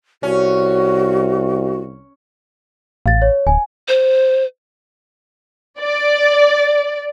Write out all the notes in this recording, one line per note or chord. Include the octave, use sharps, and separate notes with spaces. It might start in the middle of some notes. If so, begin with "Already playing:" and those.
C2 C#4 F#4
A1 F5 A6
C#5
D1 G#5
C5
D5